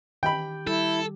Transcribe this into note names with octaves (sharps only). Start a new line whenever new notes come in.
D#3 G4 G5 B5
G3 E4 A4